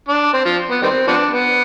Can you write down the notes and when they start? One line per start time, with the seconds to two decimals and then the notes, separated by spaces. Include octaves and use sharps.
0.09 D4
0.33 C4
0.45 F3
0.70 B3
0.82 D#3 G3 C4
1.07 F3 B3 D4
1.31 B3